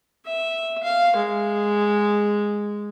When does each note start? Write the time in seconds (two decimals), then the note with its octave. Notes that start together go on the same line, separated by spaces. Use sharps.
0.26 E5
0.83 F5
1.16 G#3